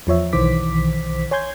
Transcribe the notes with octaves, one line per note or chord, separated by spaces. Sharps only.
E2 F3 C#5 E5
B1 D#3 E3 C5 D6 B6
C#5 G#5 C6 G6 G#6